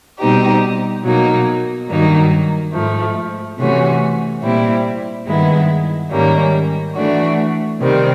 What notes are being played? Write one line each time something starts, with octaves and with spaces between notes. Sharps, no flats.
B2 G3 C4 D#4 G4
B2 F#3 A#3 D#4
G2 D#3 F#3 A#3 D#4
G#2 F3 A3
C3 E3 A3 C#4 F#4
A#2 G3 C4 E4
G2 D#3 G#3 B3 E4
G#2 D#3 G3 A#3 C#4
E3 A3 D4 F#4
C3 D#3 G3 C4